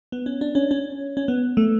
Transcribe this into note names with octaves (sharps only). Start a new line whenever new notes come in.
B3
C#4
D4
C#4
C#4
C#4
B3
A3